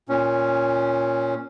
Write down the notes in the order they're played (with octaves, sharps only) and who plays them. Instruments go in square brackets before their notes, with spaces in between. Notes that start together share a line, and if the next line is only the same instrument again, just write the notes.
[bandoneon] A#2 C#4